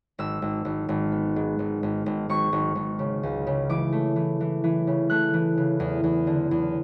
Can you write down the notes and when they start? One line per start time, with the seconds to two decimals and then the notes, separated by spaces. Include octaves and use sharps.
0.19 G#1 E6
0.42 G#1
0.65 G#1
0.89 G#1
1.12 B3
1.36 G#2
1.59 G#1
1.83 G#1
2.06 G#1
2.29 G#1 C#6
2.53 G#1
2.76 G#1
2.99 C#3
3.23 C#2
3.47 C#3
3.69 E3 D6
3.93 A3
4.16 E3
4.41 E3
4.64 E3
4.87 C#3
5.10 A3 F#6
5.34 E3
5.58 C#3
5.80 E2
6.04 E2
6.27 D3
6.51 E2